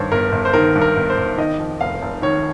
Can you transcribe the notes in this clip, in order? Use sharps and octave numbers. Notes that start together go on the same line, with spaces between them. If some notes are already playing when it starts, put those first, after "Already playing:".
Already playing: G2 D#3 C5 C#5
G1 A#4
G1
C5
D#3 A#4
G2
A#4
G1
C5
G1
D#3 D#5
F2
F1 F5
F1
D#3 C#5